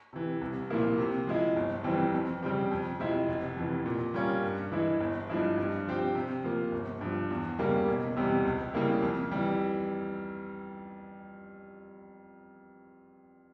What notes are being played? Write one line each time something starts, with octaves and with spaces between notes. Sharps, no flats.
C3 E3
C2
A#2 F3 A#3 E4
C3
F3 G#3 E4
G1
F2 E3 G3 C4
F2
C#3 G3 C4 G4
F2
C3 F3 G#3 E4
F1
F2 E3
A#2
G3 C#4 F4 A#4
G2
E3 G#3 E4
G1
G2 F3 G#3 E4
G2
F3 C4 G4
C3
F3 A#3
G1
G2 F3
E2
C#3 G3 A#3
E1
E2 C3 G3
C#2
C#3 G3 A#3 E4
F2
E3 G3